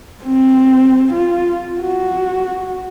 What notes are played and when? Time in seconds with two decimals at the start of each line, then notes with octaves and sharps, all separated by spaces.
0.23 C4
1.13 F4
1.81 F#4